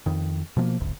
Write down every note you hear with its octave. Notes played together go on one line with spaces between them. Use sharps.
F2 D#3
B2 F3 G#3 A#3
D#1 G#1 D2